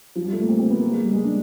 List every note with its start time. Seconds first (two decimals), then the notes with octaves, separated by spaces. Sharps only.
0.15 F3
0.25 G3
0.33 A3
0.40 A#3
0.49 C4
0.59 C4
0.70 B3
0.80 A#3
0.91 G#3
1.03 G3
1.13 G#3
1.24 D4